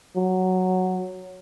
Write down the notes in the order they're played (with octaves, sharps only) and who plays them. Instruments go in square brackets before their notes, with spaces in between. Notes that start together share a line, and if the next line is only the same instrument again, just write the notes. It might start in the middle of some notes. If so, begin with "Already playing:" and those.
[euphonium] F#3